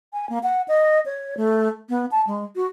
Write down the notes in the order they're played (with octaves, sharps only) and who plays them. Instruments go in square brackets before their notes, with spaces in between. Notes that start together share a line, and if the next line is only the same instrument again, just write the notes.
[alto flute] G#5
A#3
F#5
D#5
C#5
A3
B3
A5
G#3
F#4